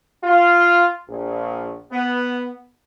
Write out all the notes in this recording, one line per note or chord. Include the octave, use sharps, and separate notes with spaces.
F4
A#1
B3